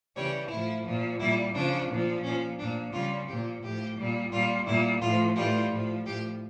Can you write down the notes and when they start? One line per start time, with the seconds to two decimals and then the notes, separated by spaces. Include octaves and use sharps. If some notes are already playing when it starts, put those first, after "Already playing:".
0.15 C#3 E3 G3 C#5
0.50 A2 F3 E4
0.85 A#2 F3
1.19 A#2 G3 E4
1.54 C#3 F3 D4
1.89 A#2 F3
2.23 A#2 F3 C#4
2.58 A#2 F3 D4
2.92 C#3 G3 F4
3.27 A#2 F3 G4
3.62 A2 F3 G4
3.97 A#2 G3
4.32 A#2 G3 F4
4.66 A#2 G3 E4
5.01 A2 F3 F4
5.35 A2 E3 G3 F4
5.71 A2 F3
6.05 A2 F3 G4